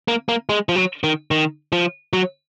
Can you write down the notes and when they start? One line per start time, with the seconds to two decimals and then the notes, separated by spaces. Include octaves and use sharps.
0.08 A#3
0.29 A#3
0.49 G#3
0.69 F3
0.76 F#3
1.04 D#3
1.31 D#3
1.72 F3
2.13 F#3